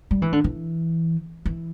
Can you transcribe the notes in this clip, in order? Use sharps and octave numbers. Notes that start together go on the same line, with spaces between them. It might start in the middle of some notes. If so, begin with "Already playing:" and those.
G3
E3
D3
E3
E3